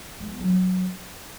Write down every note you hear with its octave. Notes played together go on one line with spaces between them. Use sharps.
G#3
B3
F#3